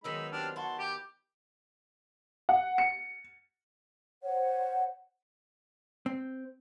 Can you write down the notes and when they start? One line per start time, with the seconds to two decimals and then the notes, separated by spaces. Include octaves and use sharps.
0.04 D#3 F#3 G#3 B3 D#4 B5 E6
0.32 C4 D4 G4 F6
0.56 E4 F#4 A5 C6
0.79 G4 G6
2.49 F#5
2.78 C#7
4.22 C5 C#5 F#5
6.06 C4